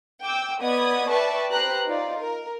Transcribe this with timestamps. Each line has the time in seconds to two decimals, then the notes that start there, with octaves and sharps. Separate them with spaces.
0.23 G5 D6 E6
0.60 B3 D5 D#5 B5 D#6 G#6
1.10 B4 D5 E5 G5 A5 C#6
1.51 G4 B4 C5 G5 A#5 F#6
1.87 D#4 F4 D5
2.17 A#4